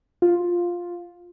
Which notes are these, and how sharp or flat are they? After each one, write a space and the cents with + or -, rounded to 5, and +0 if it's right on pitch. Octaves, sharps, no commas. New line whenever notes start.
F4 +5